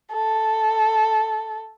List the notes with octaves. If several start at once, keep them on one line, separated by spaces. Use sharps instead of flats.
A4